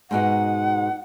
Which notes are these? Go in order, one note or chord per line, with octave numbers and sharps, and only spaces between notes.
G#2 B2 D#4 F#5